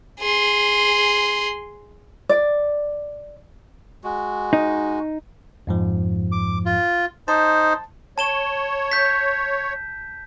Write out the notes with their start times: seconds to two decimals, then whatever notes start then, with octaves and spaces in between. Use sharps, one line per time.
0.20 G#4 C6
2.29 D5
4.04 G#3 F#4
4.53 D#4
5.67 F2 G#2 F3
6.32 D6
6.66 F4
7.28 D#4 C5 A5
8.18 C#5 A5 E7 G7
8.92 G6 B6